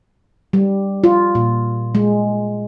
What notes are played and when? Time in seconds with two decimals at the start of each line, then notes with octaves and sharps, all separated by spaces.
0.53 G3
1.04 F4
1.35 A#2
1.95 G#3